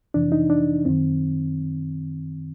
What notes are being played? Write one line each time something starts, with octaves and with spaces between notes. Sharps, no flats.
F2 C3 E3 D4
D#4
D4
F#2 D#3 C4